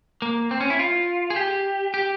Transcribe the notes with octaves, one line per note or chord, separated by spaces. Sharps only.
A#3
C4
C#4
E4
F4
G#4
G4
G4